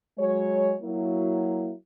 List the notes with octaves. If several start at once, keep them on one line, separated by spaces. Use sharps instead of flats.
F#3 G#3 C#5
F#3 A#3 E4